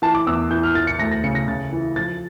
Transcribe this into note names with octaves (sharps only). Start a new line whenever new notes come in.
E3 A5
D6
E2 E6
E3 G6
F6
E3 A6
C#7
D2 A#6
A#6
C#3 C#7
A#6
C#3 A6
E3
F3 A6